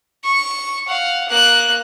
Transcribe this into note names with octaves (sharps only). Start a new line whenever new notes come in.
C#6
F5 F#5
A#3 F#6